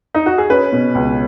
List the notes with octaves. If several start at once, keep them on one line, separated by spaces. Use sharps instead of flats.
D#4
F#4
G#4
C#4 B4
B2
C#2